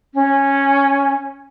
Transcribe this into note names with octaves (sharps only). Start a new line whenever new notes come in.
C#4